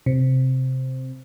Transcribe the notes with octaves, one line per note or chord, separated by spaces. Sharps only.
C3